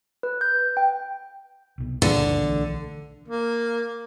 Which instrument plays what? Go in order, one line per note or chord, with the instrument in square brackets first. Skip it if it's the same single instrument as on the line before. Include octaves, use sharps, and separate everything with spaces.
[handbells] B4
G6
G5
[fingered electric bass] C2 B2
[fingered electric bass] G1 C#2 A#2 [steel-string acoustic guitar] D3
[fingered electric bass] B1 E3 A3
[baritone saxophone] A#3